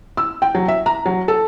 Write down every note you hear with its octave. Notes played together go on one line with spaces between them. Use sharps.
E6
G5
F#3
E5
A#5
F#3
A4